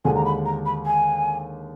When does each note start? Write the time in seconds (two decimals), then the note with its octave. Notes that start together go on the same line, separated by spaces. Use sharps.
0.05 D#2 D3 G#3 G#5
0.15 A#5
0.25 B5
0.45 A#5
0.66 B5
0.86 G#5